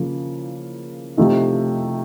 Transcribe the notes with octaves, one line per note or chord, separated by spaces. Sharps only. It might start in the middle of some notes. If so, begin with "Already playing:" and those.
Already playing: C#3 F3 A#3 F4
C3 F3 A3 D#4